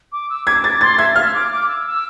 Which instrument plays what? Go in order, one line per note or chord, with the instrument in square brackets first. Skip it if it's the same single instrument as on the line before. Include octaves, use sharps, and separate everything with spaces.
[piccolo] D6
E6
[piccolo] D6 [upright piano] G#6
[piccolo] D6 [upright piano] A6
[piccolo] C6 [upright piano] A6
[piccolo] E5 [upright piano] G#6
[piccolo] F5 [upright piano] F6
[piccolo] E6
D6
D6
E6
E6